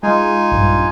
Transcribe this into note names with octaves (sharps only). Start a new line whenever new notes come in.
G#3 D#4 F4 G#5
A#1 G2